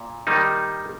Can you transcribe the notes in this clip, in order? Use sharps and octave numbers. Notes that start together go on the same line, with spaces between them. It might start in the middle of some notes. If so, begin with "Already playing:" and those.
Already playing: A#2
D#3 G3 A#3 D#4